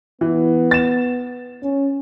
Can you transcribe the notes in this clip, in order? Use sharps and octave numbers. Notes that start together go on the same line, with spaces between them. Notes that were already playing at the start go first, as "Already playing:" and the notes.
E3 B3
A6 E7
C#4